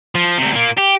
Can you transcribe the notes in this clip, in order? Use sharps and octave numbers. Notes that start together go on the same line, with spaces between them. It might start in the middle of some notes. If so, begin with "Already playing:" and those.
F3
D2 C3
A#2 A#3
G4